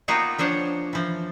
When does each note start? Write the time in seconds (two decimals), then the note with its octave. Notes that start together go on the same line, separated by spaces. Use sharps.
0.08 A#3 B3 D#4 F4 F#4 G5
0.38 F3 D4 C5 C#5
0.93 E3 F3